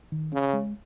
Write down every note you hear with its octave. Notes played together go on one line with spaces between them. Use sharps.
D#3
C#3 C#4
G#3